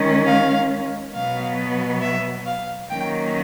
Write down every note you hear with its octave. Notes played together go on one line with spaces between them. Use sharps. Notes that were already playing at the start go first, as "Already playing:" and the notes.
Already playing: D#3 G#3 C#4
F5
B2 F#3 B3 F5
E5
F5
D#3 F#3 A#3 C#4 G5